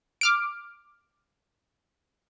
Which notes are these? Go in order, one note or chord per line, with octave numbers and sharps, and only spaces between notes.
D6 F6 D7